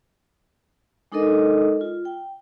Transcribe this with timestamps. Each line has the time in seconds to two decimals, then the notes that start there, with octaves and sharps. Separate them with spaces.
1.12 G#3 D4 D#4 A4 A#4 D#5
1.81 F4
2.05 G5